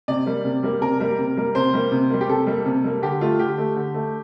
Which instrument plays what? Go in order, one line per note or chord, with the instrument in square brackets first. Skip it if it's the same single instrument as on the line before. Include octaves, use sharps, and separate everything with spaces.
[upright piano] C3 D5
G3 A#3
C3
G3 A#3
C3 A#4
G3 A#3
C3
G3 A#3
C3 C5
G3 A#3
C3
G3 A#3
G4
C3 A4
G3 A#3
C3
G3 A#3
D3 G4
A3 F4
D3 G4
A3
D3
A3